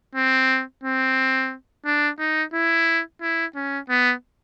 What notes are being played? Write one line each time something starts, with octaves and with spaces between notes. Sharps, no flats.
C4
C4
D4
D#4
E4
E4
C#4
B3